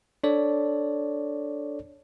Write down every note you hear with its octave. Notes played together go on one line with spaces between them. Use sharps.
D4 A4 C#5 D5